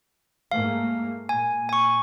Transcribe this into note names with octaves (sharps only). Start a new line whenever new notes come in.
G#2 A3 A#3 F5
A#2 G#5
G#5 C#6